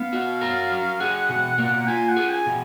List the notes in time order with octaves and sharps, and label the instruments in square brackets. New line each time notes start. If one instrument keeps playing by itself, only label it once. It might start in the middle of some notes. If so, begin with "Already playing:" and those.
Already playing: [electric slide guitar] B3 [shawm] F5
[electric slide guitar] F#4
A#4
F#3
[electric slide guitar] G#4 [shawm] F#5
[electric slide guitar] B2
A#3
[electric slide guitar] F4 [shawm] G#5
[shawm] F#5
[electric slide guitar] G#4
[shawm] G#5
[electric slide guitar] B2